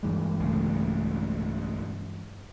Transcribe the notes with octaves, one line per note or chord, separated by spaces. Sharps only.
G2 E3 G#3
B1 C#3 A3